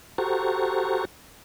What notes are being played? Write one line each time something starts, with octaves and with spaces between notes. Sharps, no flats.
F#4 G4 A4 C5 A#5 C#6